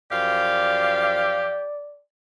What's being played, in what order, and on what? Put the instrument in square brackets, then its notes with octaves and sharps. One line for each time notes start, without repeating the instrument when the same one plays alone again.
[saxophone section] F#2 F3 F5 [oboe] G4 [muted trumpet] D5